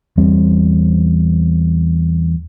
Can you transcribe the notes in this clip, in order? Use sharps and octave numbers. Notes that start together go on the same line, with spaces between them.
E2 G3 C4